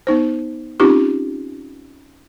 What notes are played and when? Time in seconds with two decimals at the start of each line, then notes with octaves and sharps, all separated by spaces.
0.07 B3 D#4 C5
0.80 C4 C#4 D#4 F4 G4 D6